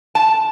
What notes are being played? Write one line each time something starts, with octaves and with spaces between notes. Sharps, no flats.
A5